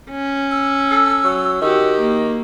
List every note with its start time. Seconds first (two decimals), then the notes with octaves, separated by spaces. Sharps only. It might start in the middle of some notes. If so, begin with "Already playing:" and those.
0.10 C#4
0.51 E6
0.91 A4
1.24 F#3
1.62 D#3 F#4 G4
2.01 A#3